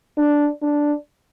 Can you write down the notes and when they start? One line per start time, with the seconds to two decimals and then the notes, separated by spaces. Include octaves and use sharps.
0.18 D4
0.63 D4